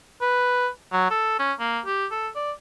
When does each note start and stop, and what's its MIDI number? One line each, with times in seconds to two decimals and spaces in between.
0.22 0.68 71
0.93 1.10 54
1.11 1.36 69
1.39 1.53 61
1.60 1.80 58
1.86 2.07 67
2.11 2.28 69
2.36 2.52 74